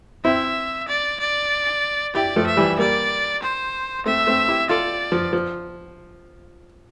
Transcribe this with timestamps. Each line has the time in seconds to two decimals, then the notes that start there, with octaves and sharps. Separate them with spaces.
0.25 C4 E4 E5
0.88 D5
1.20 D5
2.15 E4 G4 D5
2.36 F3 A3
2.47 E5
2.57 E3 G3
2.79 G3 A#3 D5
3.42 C5
4.05 A3 C4 E5
4.27 A3 C4
4.48 E4 G4
4.69 F4 A4 D5
5.12 F3
5.33 F3